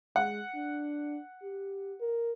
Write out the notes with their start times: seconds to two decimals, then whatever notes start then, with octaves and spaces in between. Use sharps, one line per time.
0.16 G#3 F#5
0.55 D4
1.43 G4
2.00 A#4